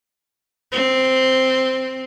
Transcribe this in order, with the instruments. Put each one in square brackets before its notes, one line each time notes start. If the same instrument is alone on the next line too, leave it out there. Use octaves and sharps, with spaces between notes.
[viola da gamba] C4